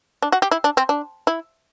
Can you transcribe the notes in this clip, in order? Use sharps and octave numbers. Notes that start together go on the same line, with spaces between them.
D4
F#4
G4
E4
D4
C4
D4
E4